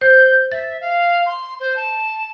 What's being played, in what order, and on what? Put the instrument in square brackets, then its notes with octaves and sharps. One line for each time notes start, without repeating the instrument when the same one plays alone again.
[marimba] C5 [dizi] G6
[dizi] E5 [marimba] A6
[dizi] F5
C6
C5
A5